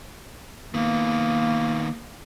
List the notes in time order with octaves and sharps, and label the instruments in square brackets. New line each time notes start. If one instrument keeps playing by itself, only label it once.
[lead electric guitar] D#3 B3 [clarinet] A#3